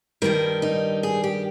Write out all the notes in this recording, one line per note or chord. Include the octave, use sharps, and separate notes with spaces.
G2 D#3 G3 A#4
D#4
G#4
G4